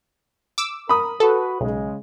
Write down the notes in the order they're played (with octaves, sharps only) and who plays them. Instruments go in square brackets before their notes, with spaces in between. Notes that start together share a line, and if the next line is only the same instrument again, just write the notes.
[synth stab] D6 E6
[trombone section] A#4 [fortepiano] B5 D#6
[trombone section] F#4 B4 [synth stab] A4
[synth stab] B1 [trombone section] C#3 G#3